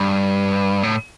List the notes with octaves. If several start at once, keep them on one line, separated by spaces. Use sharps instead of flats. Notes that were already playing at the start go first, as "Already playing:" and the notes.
Already playing: G2
A2